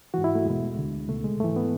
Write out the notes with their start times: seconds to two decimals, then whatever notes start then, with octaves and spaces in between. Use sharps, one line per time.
0.14 G#2 E3 F#4
0.24 E4
0.35 A3
0.45 E2 B2 G#3
0.77 D2 D3
1.08 C#2 B2 A3
1.24 G#3
1.40 G#2 E3 A3
1.56 B3